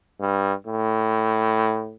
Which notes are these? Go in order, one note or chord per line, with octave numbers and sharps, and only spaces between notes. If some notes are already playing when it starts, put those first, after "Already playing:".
G2
A2